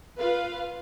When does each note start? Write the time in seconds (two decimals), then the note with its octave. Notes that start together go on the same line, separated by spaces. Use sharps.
0.18 F4 B4 F5